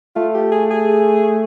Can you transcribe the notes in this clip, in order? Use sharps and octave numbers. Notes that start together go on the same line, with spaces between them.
A3 F4
G4
G#4
G#4